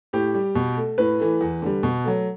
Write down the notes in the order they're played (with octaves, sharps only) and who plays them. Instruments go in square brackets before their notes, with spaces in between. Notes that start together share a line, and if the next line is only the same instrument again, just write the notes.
[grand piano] A2 G4
G3
B2
A3
A2 B4
E3 A3
E2
D3 G3
B2
F#3 A3